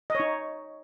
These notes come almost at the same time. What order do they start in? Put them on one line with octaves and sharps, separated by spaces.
D#5 C#5 D#4